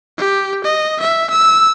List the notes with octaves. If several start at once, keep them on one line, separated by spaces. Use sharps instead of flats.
G4
D#5
E5
E6